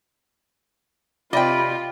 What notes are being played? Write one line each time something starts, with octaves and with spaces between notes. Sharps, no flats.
C3 F4 D5 D#5 G5 B5